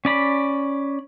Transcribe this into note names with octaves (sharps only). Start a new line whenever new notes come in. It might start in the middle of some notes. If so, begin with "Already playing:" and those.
C#4 D5 B5